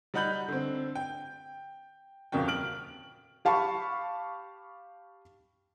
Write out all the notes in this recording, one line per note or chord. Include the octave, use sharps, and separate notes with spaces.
G3 D#4 F#5 B5 G6 F#7
D3 C4
G5
D#1 F2 C#3 A#3 F#4 G5
F6 D7 F#7
G4 F5 A5 B5 C#6